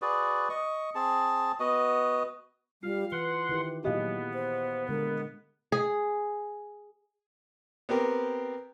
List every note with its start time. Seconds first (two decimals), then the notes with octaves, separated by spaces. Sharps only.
0.02 F#4 G#4 B4 D5
0.49 D#5 C#6
0.95 C4 G#4 A5
1.60 B3 F#4 D#5
2.83 G3 F4 F5
3.12 E3 B4 F#5 C6
3.49 D#3 E4 G4
3.84 A#2 F#3 B3 E4 G4 G#4 D#5 F5
4.34 C5
4.89 D3 G#3 A#4
5.72 G#4
7.89 B3 C4 G4 A#4